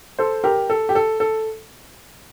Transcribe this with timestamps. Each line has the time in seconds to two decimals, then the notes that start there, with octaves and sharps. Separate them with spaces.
0.19 A4 C5
0.44 G4 A#4
0.70 A4
0.89 G4
0.95 A4
1.20 A4